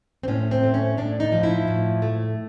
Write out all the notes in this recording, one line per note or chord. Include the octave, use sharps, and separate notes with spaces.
C4
A2 C#4
C4
A3
C#4
A2 D4
D#4
F3
E4
A2
A3